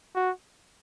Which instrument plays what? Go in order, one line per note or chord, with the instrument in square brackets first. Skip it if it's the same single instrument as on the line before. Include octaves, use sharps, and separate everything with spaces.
[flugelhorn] F#4